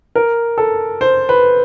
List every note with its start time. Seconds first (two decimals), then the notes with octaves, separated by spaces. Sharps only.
0.16 A#4
0.58 A4
1.01 C5
1.29 B4